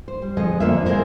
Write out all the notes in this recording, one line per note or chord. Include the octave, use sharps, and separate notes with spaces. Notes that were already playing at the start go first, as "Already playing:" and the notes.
C5
G3
F2 D3 G#3 D#5
F2 D3 A#3 D4 F4 E5
G#3 C4 C#4 E4 A#4 C5